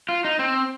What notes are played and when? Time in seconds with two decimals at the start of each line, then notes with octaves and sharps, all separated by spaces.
0.09 F4
0.25 D#4
0.39 C4